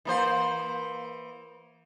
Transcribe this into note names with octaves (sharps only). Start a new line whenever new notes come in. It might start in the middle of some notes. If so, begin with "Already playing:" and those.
E3 A#3 C5